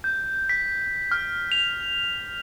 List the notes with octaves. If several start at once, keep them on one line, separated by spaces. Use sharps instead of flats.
G6
B6
F6
F7